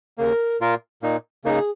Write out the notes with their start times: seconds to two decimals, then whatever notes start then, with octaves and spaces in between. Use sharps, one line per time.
0.18 D#2 C#3 A#3 A#4
0.61 A#2 A#3 F4 A#4
1.02 A#2 A#3 D#4
1.44 C#3 A#3 D#4 G#4 A#4